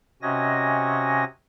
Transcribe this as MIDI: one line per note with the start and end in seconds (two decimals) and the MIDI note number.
0.22 1.24 48
0.22 1.24 61
0.22 1.24 66
0.22 1.24 75
0.22 1.24 80
0.22 1.24 94